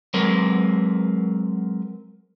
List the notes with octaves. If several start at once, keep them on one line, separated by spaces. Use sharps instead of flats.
F#3 G#3 C4 A#4 B4